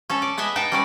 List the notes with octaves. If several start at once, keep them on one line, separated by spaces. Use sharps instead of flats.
C#4 A4
D5
B3 G#4 D#5 E5
D#4 B4 G5 A5
G3 C#4 D5